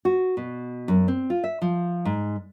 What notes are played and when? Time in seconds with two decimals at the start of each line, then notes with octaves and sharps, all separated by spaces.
0.05 F#4
0.37 B2
0.88 F#2
1.08 C4
1.30 F4
1.44 E5
1.62 F3
2.05 G#2